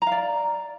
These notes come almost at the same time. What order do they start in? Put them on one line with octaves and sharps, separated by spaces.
A#5 F5 D5